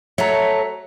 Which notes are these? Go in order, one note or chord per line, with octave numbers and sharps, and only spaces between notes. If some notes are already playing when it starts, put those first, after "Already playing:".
F#3 A3 C#5 E5 A#5